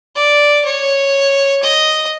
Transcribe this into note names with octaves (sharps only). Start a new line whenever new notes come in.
D5
C#5
D#5